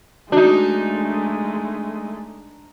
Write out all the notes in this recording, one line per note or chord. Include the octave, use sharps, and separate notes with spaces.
G#3 A3 D4 D#4 F#4